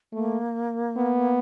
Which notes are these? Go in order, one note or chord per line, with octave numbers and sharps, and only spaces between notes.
A3 A#3
B3